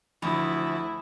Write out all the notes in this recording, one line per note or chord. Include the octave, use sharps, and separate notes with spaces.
D2 F3 E4 B5 D#6